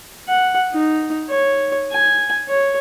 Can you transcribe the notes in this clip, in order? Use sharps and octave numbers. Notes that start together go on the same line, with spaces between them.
F#5
D#4
C#5
G#5
C#5